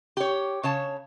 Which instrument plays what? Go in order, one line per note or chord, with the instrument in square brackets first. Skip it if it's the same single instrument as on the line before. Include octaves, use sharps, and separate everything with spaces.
[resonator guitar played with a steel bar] G4 C#5
C#3 C#5 A5